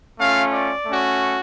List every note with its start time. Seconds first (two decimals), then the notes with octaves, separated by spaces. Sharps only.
0.20 A3 C#4 F4 F5
0.53 D5
0.86 A3 C#4 F#4